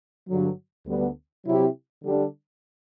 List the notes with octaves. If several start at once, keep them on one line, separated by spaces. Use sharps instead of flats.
G2 D3 F#3
D2 D3 G3 B3
C3 F#3 C4 E4 G4
D3 G3 D4